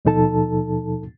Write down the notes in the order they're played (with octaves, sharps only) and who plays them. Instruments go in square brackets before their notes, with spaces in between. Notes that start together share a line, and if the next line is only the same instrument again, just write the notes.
[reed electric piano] D#2 B2 F3 D#4 A4 A5